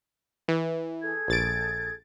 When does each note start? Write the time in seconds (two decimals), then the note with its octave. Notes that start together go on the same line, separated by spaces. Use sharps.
0.48 E3
1.01 G#4 A4 G#6
1.28 A#1 A6 D7